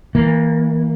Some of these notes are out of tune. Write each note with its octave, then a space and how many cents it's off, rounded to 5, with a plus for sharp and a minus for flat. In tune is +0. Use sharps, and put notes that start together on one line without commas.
E3 -25 A#3 +0